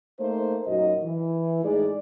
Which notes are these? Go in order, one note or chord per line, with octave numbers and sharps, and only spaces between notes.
A3 A#3 D#4 C5
F#2 A#2 F#3 D#4 F#4 D#5
E3
A2 G#3 D#4 G#4 D5